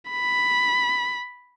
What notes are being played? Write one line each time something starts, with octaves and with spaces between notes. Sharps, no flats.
B5